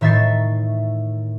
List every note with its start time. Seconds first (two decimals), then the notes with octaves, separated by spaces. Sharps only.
0.01 A2 D#3 E5 C#6 A6 C7